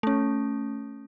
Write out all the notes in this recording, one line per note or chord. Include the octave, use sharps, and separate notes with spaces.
A3 C#4